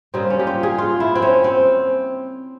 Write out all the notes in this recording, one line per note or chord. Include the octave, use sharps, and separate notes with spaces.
C#3 G3 A#3 C4
C#4
G4
F4
G#4
F4
E4
C4
C#4
C4